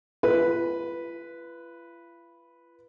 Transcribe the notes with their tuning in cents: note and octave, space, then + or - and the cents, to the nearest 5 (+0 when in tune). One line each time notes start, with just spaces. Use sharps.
F4 -45 B4 -5